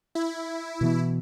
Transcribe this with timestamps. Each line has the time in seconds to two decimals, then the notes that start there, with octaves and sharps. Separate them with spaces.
0.15 E4
0.81 B2 E3 B3